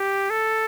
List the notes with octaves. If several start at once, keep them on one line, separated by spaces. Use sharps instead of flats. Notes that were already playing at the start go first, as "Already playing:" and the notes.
Already playing: G4
A4